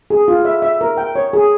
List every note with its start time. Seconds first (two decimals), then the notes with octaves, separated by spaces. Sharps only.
0.10 G#4
0.28 F4
0.45 E5
0.62 E5
0.81 A#4
0.97 G5
1.15 C#5
1.33 G#4